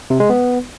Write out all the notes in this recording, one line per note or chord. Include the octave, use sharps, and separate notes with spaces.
C3
G#3
B3